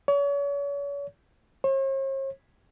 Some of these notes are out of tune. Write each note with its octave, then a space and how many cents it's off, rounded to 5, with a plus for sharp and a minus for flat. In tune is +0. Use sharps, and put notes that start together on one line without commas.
C#5 +40
C#5 -45